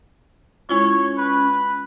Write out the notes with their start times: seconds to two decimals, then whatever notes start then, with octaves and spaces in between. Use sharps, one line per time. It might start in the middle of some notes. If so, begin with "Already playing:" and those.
0.69 G#3 C#4 E4 F4 C#5
1.18 B4